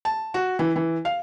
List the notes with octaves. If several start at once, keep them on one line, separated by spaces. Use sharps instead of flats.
A5
F#4
E3
E3
F5